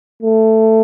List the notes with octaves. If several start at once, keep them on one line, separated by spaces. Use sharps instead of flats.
A3